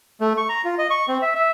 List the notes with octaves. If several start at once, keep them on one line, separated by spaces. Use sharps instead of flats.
A3
C#6
A#5
F4
D#5
C#6
C4
E5
E5